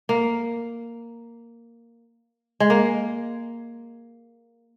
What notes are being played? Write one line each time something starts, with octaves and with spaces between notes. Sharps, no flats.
A#3
G#3
A#3